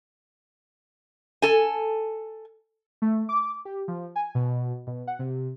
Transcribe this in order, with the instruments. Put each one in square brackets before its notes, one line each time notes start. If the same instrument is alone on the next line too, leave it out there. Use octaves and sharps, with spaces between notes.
[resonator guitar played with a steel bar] A4 G#5
[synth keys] A3
D6
G4
F3
G#5
B2
B2
F#5
C3